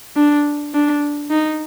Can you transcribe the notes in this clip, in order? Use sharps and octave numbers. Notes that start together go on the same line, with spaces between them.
D4
D4
D#4